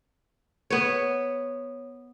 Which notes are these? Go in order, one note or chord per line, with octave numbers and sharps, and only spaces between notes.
B3 C#5